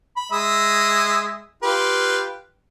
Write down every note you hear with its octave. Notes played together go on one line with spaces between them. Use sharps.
B5
G#3 E5 D#6
F4 G4 B4